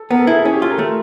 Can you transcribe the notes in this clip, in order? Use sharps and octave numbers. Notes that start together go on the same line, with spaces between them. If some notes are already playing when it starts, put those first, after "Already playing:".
Already playing: A4
B3 A#4
A4
E4 G#4
A4
C#4 G#4
G4
F4 A4
A#4
A3